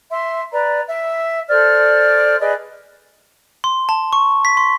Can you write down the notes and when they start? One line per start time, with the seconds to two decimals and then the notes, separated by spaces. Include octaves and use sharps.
0.11 E5 C6
0.52 B4 D5 A#5
0.87 E5
1.48 A4 C5 D5 F6
2.39 G#4 B4 D5 D#5
3.64 C6
3.89 A5
4.13 C#6
4.45 B6
4.57 C6